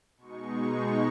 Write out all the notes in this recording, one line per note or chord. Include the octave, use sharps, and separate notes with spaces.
B2 G#3 D#4 C#6